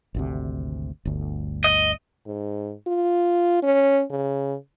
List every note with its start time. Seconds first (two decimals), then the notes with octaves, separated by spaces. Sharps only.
0.15 G#1 D2 C3
1.05 G1 D2
1.64 D#5
2.26 G#2
2.87 F4
3.63 C#4
4.10 C#3